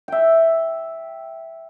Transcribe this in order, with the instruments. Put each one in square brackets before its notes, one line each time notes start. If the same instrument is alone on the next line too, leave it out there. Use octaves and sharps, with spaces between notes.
[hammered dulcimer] E5 G5